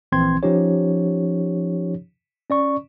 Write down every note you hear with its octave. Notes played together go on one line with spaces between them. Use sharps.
A#1 E3 C4 C6 G#6
F3 C#4 D#4 G4 C#5
C#4 D5 C#6